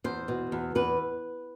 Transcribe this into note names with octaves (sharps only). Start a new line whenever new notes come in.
E2 C5
B2
E2
E2 B4